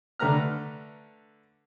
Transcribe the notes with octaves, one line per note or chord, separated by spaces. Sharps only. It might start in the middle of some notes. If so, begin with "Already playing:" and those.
D3 A3 B4 A#5 F6